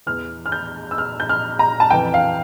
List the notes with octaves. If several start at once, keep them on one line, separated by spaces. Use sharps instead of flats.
E2 E3 F6
F6
G6
E6
F6
G6
F6
A#5
A5
F2 E3 G5
F5